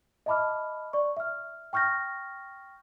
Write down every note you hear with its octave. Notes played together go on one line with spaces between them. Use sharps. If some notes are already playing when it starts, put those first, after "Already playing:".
D#5 E5 A5 B5 D6 F6
D5 C#6
E5 F6
G5 C#6 F6 G6 A#6